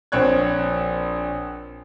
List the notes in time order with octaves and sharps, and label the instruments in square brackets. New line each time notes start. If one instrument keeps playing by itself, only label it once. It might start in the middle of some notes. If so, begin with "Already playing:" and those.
[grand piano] A#1 C4 C#5 F#6 G#6